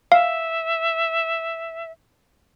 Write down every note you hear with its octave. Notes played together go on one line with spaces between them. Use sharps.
E5 F5